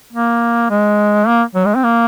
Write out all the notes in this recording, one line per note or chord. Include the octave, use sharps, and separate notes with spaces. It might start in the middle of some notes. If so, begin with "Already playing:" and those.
A#3
G#3
A#3
F#3
G#3
C4
A#3